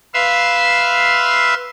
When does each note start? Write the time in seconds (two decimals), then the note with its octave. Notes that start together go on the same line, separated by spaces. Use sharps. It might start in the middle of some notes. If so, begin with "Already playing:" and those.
0.14 B4 E5 F5 C6 E6